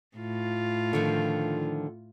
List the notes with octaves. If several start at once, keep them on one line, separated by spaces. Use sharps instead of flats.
A2 F4
D3 D#3 F3